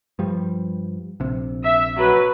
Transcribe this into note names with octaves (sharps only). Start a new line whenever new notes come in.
G2 F3 G3
A#1 C3
E5
F#3 B4